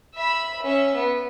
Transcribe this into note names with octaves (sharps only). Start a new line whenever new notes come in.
E5 B5
C#4 E5
B3